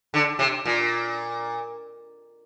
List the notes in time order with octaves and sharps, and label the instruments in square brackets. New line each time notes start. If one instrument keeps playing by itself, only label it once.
[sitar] D3
C3
A#2